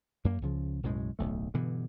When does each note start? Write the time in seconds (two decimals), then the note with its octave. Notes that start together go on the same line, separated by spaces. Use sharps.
0.25 F#2 A#3
0.42 C#2 C#3 F3
0.83 B1 F#2 A2 G#3
1.19 D1 B1 A3
1.54 G2 B2 D3 E3